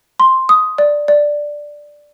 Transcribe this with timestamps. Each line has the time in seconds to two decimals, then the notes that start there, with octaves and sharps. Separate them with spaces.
0.20 C6
0.49 D#6
0.78 D5
1.08 D5